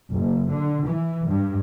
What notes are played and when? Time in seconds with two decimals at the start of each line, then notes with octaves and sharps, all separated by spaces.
0.12 F#1
0.51 D3
0.87 E3
1.28 G2